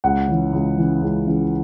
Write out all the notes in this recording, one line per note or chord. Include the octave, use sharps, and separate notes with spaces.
C#2 F#5
C#3 E3
C#2
C#3 E3
C#2
C#3 E3